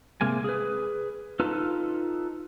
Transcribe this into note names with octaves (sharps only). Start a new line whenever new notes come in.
C3 G#3 A#3 G#5
G#4 B4
D#4 F4 A4 B4